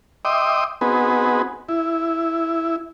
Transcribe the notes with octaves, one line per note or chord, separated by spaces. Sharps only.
D#5 E5 G5 C6 D6 D#6
B3 C4 D#4 F#4 G#4 B4
E4